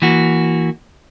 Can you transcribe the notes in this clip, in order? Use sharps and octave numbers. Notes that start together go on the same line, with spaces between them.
E3 A#3 F#4